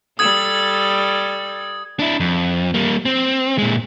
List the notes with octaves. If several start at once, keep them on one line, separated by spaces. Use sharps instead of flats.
G3 A4 D#6 G#6
D4 E4
F2
G3 A#3
C4
A#2 G#3